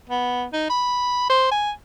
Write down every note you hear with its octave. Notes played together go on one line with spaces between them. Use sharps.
B3
D#4
B5
C5
G#5